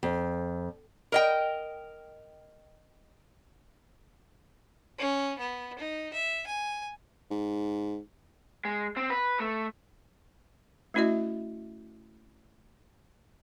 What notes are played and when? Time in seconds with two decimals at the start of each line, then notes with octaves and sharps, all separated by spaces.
0.03 F2
1.12 A#4 D#5 G5
4.98 C#4
5.39 B3
5.79 D#4
6.13 E5
6.47 G#5
7.31 G#2
8.65 G#3
8.97 C4
9.10 B4
9.40 A3
10.94 A3 C#4 E4 F#4 D#5 E5